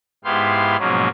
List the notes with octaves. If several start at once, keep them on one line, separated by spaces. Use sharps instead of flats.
G#2 B3 E4 G4 F5 C6
G#2 B2 F3 F#3 A#3 C#4